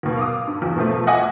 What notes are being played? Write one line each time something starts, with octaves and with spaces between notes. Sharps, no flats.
D#2 B2
F5 D6 D#6
G2
E2
B2 F3 A3
D#5 E5 F#5 G#5 D6 D#6